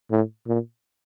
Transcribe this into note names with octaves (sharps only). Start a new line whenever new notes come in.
A2
A#2